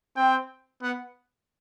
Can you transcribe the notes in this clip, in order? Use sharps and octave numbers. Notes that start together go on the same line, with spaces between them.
C4 G5
B3 F#5